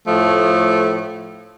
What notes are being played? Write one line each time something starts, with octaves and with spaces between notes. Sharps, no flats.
A2 F3 A3